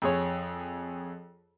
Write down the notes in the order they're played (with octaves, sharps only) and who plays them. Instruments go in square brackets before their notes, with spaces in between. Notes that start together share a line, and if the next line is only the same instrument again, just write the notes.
[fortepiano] F2 G#4 C#5